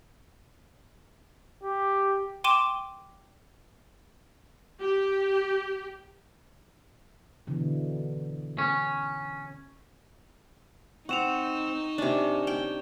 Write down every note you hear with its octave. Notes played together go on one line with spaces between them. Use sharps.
G4
G5 C6 D6 D#7 E7 G7
G4
B2 D3 E3
C#4
C4 D#4 F#5 C#6 E7 F7
C3 C#4 D4
G5